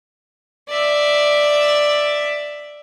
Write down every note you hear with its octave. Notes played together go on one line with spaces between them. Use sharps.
D5 E5